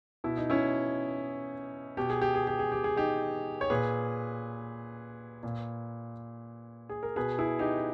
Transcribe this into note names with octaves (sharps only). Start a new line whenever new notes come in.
B2 E4
D#4
C#4 E4
B2 G4
G#4
G4
G#4
G4
G#4
G4
G#4
D#4 G4
C#5
A#2 G#4 B4
A#2
G#4
A#4
B2 G#4 B4
E4 G#4
D#4 G4